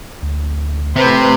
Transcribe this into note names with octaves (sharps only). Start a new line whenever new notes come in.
D2
A2 C3 B4 C5